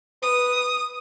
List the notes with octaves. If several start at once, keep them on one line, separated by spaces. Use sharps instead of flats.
B4 D#6